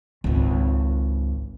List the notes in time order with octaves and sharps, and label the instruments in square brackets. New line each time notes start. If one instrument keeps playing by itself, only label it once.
[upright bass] G#1 C#2